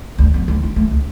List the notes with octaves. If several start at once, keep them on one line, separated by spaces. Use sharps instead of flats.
D2
F2
D2
D3
A3
C#2